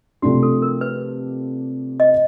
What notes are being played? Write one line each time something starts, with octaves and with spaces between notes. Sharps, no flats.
C3 F3 A3 D4 F#4
A4
A#4
B4
D#5